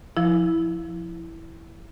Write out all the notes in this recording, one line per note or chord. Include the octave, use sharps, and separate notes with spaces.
F3 E4